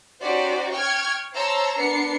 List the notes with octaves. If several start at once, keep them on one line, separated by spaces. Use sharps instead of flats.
C#4 D#4 F#4 G4 C5 D5
G5 C#6 F6 G#6
C5 C#5 A5 A#5 C6 E6
B3 D4 A#4 C7 C#7